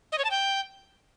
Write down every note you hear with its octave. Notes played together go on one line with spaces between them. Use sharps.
D#5
C#5
A5
G5